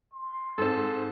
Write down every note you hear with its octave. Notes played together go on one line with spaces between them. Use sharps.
C6
G#2 C4 A4